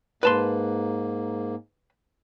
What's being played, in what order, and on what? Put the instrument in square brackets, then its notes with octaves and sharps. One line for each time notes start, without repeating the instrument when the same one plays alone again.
[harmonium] G#2 A#3 [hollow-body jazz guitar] B4 A5 C6